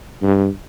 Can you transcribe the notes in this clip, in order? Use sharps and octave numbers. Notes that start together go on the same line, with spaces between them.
G2